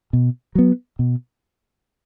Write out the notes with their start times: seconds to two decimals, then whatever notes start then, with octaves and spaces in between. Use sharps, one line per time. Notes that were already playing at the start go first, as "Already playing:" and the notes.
0.13 B2
0.55 F#3 B3
0.99 B2